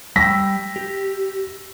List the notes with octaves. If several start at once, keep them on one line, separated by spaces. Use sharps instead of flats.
G3 G5 E6 A#6 B6
G4